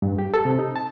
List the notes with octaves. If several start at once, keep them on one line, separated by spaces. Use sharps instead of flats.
G2
G4
A4
C3
D#4
A5